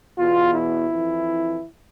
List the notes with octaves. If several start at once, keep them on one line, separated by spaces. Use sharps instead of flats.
E2 B2 F4
E4
F2 E3